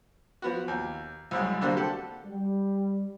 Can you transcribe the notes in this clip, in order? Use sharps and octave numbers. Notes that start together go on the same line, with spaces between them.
F3 B3 F#4
D#2
C2 F#2 G#3
D3 G3 A#3 D4 F#4 C5
G4 A4 F#5
G3